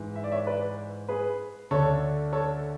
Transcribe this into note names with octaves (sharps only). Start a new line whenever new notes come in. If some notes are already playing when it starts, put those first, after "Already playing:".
Already playing: G#2 E3
E5
D5
C#5 E5
B4 D5
G#4 B4
D2 D3 A4 C#5
A4 C#5